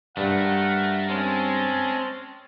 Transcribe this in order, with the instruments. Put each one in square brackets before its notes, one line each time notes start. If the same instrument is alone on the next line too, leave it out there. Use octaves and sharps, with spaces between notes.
[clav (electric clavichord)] G2 [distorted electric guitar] A3 [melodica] A#4 [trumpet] F#5
[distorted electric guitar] G#3 [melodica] C4 A5 [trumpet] C#4